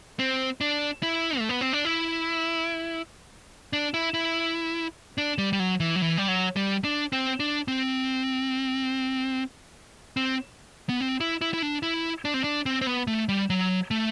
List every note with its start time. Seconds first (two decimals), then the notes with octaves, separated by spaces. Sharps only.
0.19 C4
0.61 D4
1.03 E4
1.39 A3
1.49 B3
1.61 C4
1.73 D4
1.85 E4
3.73 D4
3.94 E4
4.14 E4
5.18 D4
5.38 G3
5.53 G3
5.60 F#3
5.80 E3
5.96 F#3
6.02 E3
6.17 G3
6.28 F#3
6.56 G3
6.84 D4
7.12 C4
7.40 D4
7.68 C4
10.17 C4
10.89 B3
11.01 C4
11.20 E4
11.41 E4
11.54 E4
11.62 D4
11.83 E4
12.25 D4
12.34 C4
12.44 D4
12.66 C4
12.81 C4
12.87 B3
13.07 A3
13.29 G3
13.50 F#3
13.91 A3